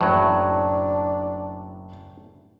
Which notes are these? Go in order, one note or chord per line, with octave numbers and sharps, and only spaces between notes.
F#1 A2 F#3 D4